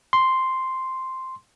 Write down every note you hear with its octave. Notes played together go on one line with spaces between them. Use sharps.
C6